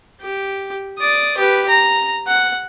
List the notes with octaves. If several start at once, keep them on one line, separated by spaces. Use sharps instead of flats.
G4
D5 D#6
G4 B4
A#5
F#5